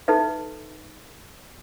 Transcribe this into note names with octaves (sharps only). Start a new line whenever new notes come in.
D#4 A4 B4 E5